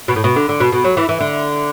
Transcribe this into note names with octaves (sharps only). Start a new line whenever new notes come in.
B2
A2
B2
D3
D3
B2
B2
F#3
E3
E3
D3